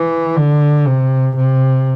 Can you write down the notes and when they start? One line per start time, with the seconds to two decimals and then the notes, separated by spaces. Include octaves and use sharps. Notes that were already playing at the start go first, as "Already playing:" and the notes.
Already playing: E3
0.36 D3
0.87 C3
1.36 C3